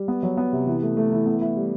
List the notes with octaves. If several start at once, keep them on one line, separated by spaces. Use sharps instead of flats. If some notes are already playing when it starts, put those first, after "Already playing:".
Already playing: G3
B3
F#3
B3
C3
E3
A3
A3
E3
B3
E4
G3